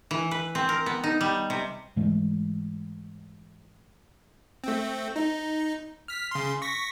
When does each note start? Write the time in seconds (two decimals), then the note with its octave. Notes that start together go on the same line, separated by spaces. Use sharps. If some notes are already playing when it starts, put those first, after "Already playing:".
0.11 E3
0.31 B4
0.55 C4
0.69 A#4
0.86 B3
1.04 D#4
1.21 G3
1.50 C3
1.96 G#2 E3 G#3 A3
4.64 A3 C4
5.16 D#4
6.08 F6 B6
6.31 C#3 C6
6.62 C#6 A#6 B6